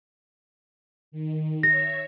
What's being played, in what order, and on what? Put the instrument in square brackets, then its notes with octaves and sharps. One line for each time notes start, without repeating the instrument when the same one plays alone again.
[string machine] D#3
[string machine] C#5 E5 [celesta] A#6